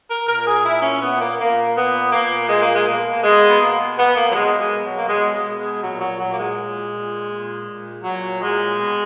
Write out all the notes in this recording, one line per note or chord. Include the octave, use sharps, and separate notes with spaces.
A#4
A#2 A#4
G#4
A#2 E4
C#4
A#2 B3
A#3
A#2 A#3
A#2 B3
A#2 A#3
A#2 G#3
A#3
G#3
B2 A#3
B2 G#3
B3
B2 A#3
B2 B3
A#3
F#3
B2 G#3
G#3
B2
F#3
A#3
B2 G#3
G#3
B2
G#3
A#2 F#3
F#3
A#2 F#3
A#3
G#3
A#2
A#2
A#2
A#2
A#2 F#3
A#2 G#3
B2